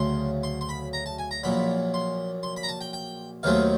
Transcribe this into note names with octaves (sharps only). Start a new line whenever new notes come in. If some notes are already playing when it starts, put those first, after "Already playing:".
Already playing: D2 C#3 F#3 A3 C6
C6
C6
B5
A#5
A5
G#5
A#5
A#1 A#2 F#3 B5
C6
C6
B5
A#5
A5
G5
G5
D#2 D#3 F#3 A3 C4 F5